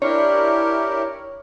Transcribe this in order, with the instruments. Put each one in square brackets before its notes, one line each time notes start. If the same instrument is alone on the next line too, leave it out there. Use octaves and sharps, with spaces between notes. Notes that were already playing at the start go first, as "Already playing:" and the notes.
[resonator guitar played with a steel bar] D4 [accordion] E4 G4 A#4 [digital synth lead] C#5